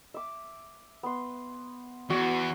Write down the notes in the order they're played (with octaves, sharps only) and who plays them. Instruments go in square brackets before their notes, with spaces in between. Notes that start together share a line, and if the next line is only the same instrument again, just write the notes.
[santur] E5 D6
B3 C6
[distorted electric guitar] E2 [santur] F#4